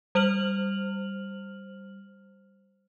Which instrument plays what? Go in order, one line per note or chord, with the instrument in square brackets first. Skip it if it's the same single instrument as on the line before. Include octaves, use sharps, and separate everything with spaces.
[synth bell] G3 C5 F6 F7 F#7